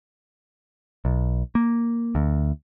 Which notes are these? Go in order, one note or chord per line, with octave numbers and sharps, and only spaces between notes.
B1
A#3
D2